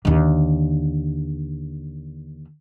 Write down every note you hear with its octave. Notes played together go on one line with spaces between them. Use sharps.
D#2 D3